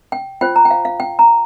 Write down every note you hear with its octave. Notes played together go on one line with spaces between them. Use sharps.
G5
F4 C5 G5
A#5
G5
F5
F5
G5
A#5